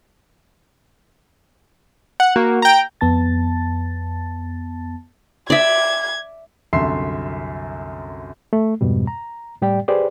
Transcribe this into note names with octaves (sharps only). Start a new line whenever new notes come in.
F#5
A#3 F#4
G5 A#5
F2 B3 A5 A6
D5 E5 G#6
C2 F#2 D3 E5 C6 C7
A3
F2 G#2 B2 G3
A#5
A2 G3 G4 D5 G5
G4 G#4 B4 C5 D5